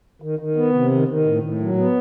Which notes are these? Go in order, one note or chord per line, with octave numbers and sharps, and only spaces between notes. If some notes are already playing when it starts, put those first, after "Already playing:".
D#3
D#3
B3
C3
D#3
D#3
A2
A2
F#3
B3